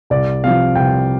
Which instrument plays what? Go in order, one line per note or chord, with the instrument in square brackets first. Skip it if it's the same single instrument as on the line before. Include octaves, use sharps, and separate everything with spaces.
[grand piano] C2 D5
C3 F3 F5
C2 G5